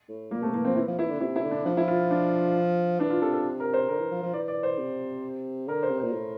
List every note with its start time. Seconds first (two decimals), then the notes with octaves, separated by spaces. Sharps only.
0.09 A2
0.31 A#2 A#3
0.42 C3 A3
0.54 E3 A#3
0.65 F3 C4
0.76 E3 E4
0.87 F3
0.99 E3 E4
1.10 D3
1.21 C3 E4
1.36 E4
1.43 D3
1.51 D4
1.65 F3 D4
1.77 E4
1.88 F4
2.11 D4
3.00 E3 D4
3.10 F4
3.22 C3 A4
3.33 A4
3.60 A#4
3.74 C5
3.88 D3 A#4
4.00 E3
4.11 F3
4.23 F3
4.33 E3 D5
4.48 D5
4.63 C5
4.78 C3
5.67 D3 A#4
5.83 C5
5.90 C3
5.98 C5
6.04 A#2
6.12 A2